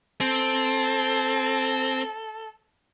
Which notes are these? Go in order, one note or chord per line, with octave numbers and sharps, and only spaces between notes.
C4 A4